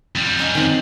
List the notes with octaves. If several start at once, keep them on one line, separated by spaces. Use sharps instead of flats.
F2 G3
C#4 D#4 F#5
D#3 C4